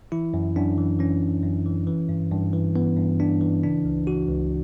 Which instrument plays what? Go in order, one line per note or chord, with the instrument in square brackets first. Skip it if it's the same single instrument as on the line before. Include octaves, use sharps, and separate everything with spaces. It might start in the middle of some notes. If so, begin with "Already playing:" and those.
[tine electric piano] E3 E4
F#2
F#2 D4
E3
E3 C#4
F#2
F#2
E3
E3
G2
G2
E3
E3 B3
G2
G2 D4
E3
C#3 D4
C#2
E3 F#4
C#2